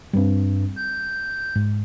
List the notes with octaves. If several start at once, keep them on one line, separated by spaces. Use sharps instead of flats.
G2 G3 C4
G6
G#2